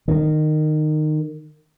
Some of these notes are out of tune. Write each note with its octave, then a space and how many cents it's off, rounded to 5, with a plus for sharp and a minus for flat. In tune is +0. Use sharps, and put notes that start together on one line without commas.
D#3 -20